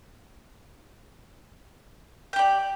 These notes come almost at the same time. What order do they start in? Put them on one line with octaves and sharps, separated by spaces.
G5 G4 D5